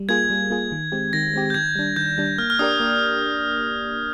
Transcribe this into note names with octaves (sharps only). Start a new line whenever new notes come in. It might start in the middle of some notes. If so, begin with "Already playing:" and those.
Already playing: G3
A#3 F4 G#4 G#6
G3
A#3 F4 G#4
D#3
G#3 C4 G4
D#3 A#6
G#3 C4 G4
G6
D#3 G#6
G3 D4
D#3 G6
G3 D4
A#3 F6
F6
D4 G4 A#4 D5 D#6
A#3